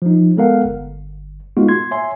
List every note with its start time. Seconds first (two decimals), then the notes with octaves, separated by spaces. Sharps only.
0.02 F3 D#4
0.37 G#3 B3 A4 A#4 F5 F#5
0.65 G1
1.57 G#3 A#3 B3 D#4 F4 F#4
1.69 C6 G#6
1.91 C#5 E5 G#5 C6